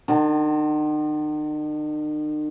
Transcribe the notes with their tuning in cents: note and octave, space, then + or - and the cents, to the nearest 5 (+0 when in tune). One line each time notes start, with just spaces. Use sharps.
D#3 -45 A5 +15